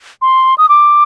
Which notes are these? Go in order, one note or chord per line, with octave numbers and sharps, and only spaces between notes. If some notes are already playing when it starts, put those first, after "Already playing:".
C6
D#6
D6